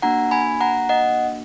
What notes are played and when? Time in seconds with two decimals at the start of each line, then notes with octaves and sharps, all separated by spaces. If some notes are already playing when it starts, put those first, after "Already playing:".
0.02 A#3 D4 F#4 F#5 A#5
0.31 G#5 B5
0.61 F#5 A#5
0.89 D#5 F#5